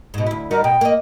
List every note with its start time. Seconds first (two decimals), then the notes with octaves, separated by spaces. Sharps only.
0.14 G#2 B2
0.26 D2 E4
0.51 G3 D#4 F#4 A#4
0.64 B2 G5
0.81 A#3 D#5